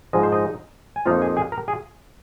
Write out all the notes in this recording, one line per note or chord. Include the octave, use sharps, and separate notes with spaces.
G#2 F3 G#3 D#5
C5
D#4 D#5
G#5
F2 F3 A#3 D#4 F4 F5
G#4 G#5
G#4 G#5
A#4 A#5
G#4 G#5